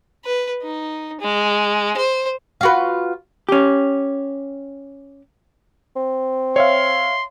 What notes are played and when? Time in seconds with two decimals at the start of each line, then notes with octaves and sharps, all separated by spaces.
0.25 B4
0.62 D#4
1.21 G#3
1.97 C5
2.61 F4 F#4 B4
3.49 C#4 G4
5.96 C4
6.56 C#5 E5 F5 C6